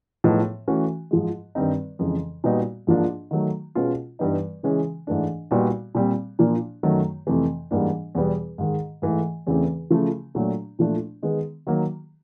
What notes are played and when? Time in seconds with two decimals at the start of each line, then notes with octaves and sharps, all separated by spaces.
0.24 A2 F3 G#3 B3 D#4
0.68 E3 A3 C#4 F#4
1.11 G#2 F3 G#3
1.55 G2 D#3 G3 C4 D#4
1.99 F2 C#3 E3 G#3
2.44 A#2 G3 B3 D#4 F#4
2.87 G#2 F3 A#3 D4 F4
3.31 D#3 F#3 A3
3.75 B2 G#3 C#4 F4
4.19 G2 E3 G3 B3 D#4
4.63 C#3 E3 G#3 C#4
5.07 G#2 E3 A3 D4
5.51 A#2 G3 B3 D#4 F#4
5.95 A#2 G3 C4
6.39 A#2 F3 A#3 D4
6.83 F#2 D#3 F#3 A3
7.27 F2 C3 E3 A3
7.71 G#2 E3 G3 A#3 D4
8.15 E2 B2 G3 B3
8.58 G#2 D#3 G#3
9.02 G#2 E3 A3
9.47 E2 C#3 E3 A3 C4
9.90 C#3 F3 A3
10.35 A#2 F#3 A3 D4
10.79 A#2 F3 A3 D4
11.23 D#3 G#3 B3
11.67 D#3 F#3 A#3